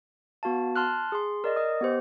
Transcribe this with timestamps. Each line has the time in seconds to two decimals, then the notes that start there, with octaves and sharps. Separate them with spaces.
0.43 B3 F#4 F5 A5
0.76 A5 C6 F6 F#6
1.12 G#4 C6
1.44 A#4 D5 D#5
1.56 D#5 D#6
1.81 B3 G4 C5